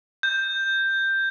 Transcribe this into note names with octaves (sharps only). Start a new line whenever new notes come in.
G6